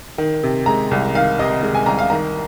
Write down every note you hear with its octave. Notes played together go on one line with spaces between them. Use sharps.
D#3
C3
G#3 A#5
C2
D#3 F5
C3 D#5
G#3
G#5
C2 A#5
F5
D#3 A#5